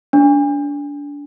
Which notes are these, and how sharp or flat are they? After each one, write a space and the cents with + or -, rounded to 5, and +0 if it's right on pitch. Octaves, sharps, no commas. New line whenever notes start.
D4 -25